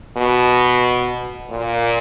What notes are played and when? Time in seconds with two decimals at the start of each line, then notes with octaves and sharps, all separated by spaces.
0.17 B2
1.51 A#2